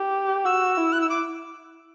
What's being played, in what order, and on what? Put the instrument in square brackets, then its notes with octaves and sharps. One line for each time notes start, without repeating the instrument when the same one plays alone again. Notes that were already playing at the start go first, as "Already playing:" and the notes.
Already playing: [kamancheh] G4
[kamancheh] F#4 [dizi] E6
[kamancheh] E4
[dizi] F#6
E6
D6